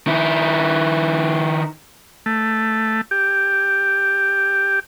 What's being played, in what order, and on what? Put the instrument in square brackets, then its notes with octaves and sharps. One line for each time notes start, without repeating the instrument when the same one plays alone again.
[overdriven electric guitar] D#3 E4
[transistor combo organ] A3
G4